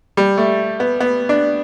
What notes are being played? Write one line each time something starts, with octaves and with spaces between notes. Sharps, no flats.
G3
A3
B3
B3
D4